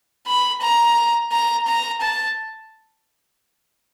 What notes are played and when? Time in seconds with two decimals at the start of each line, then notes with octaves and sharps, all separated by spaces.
0.27 B5
0.61 A#5
1.32 A#5
1.67 A#5
2.01 A5